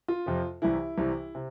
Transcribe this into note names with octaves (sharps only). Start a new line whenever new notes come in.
F4
F2 C3 F3
C2 C3 E3 E4
C2 C3 E3
C3